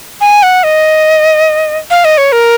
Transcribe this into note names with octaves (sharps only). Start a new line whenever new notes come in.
G#5
F#5
D#5
F5
D#5
C#5
A#4